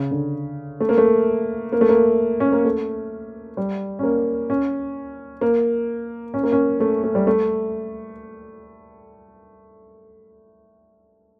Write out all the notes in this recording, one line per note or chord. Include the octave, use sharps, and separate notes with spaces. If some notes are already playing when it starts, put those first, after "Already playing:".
Already playing: C#3
D3
A3
A#3
A3
A#3
A3
A#3
C#4
A#3
A3
G3
C#4
A#3
C#4
A#3
C#4
A#3
C#4
A3
A3
G3
A3